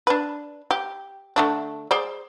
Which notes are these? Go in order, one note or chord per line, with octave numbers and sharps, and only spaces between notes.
D4 B4
G4
D3 A3 D4
G#4 C5 D5